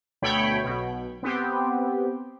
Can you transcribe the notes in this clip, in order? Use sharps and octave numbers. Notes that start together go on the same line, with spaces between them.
D2 B2 A3 C#5 G5 B5
B1 B2
B3 C4 G4